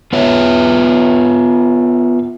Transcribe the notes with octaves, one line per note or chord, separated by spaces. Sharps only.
B3 F4 B4 C#5 E5